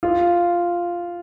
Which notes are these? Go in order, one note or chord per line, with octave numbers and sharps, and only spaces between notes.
F4